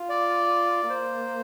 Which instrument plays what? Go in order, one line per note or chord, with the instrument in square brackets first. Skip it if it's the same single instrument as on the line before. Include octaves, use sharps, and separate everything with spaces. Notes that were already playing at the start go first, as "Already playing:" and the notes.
Already playing: [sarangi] F4
[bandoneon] D5
[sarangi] A#3 [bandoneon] C5